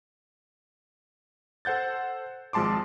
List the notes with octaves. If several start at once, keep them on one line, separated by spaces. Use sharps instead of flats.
A4 C5 F#5 G6 A6
G#1 F3 G#3 A5 C6 D6